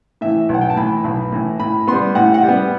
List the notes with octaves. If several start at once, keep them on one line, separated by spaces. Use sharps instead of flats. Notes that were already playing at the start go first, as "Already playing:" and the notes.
A2 E3 E5
B1
F#5
G5
A5
A2 E3 B5
B1 B5
A2 E3
A2 B5
G3 B3 C6
A2 F#5
F#5
G3
B3